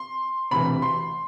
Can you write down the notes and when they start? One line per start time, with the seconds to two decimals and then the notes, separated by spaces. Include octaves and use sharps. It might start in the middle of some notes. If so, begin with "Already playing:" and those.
Already playing: C6
0.51 E1 D2 C3 E3 B5
0.82 C6